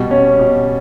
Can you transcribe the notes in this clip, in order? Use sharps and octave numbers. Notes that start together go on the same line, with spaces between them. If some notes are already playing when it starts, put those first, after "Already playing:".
Already playing: B2 G3
C#4
B2